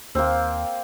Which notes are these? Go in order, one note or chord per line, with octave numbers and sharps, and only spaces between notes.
D#2 A#3 C4